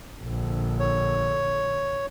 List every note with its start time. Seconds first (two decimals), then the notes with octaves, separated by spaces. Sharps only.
0.22 A#1 D3
0.79 C#5